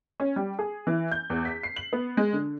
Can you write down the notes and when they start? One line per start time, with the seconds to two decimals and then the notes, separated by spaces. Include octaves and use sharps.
0.20 C#4
0.36 G3
0.59 G#4
0.87 E3
1.11 G6
1.30 E2
1.45 B6
1.63 C7
1.76 F#7
1.93 B3
2.17 G#3
2.33 D3